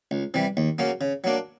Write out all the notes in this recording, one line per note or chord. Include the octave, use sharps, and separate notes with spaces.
C#2
C3 E3 G3
D#2
C#3 F#3 A#3 C#4
C#3
F#3 A#3 D4